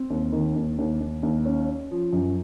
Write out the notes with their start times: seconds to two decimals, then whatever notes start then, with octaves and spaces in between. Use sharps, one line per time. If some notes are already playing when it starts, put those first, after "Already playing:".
Already playing: C4
0.10 D#2
0.32 D#3
0.56 D#2
0.78 D#2
1.00 D#2
1.23 D#2
1.45 C#4
1.68 C#4
1.91 F3
2.13 F#2